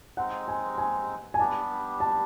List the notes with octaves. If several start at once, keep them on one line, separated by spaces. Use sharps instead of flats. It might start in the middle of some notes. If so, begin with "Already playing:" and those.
G#3 C4 D#4 F#5
G#5
G#5
G#5
G3 B3 D4 G4 A5
A5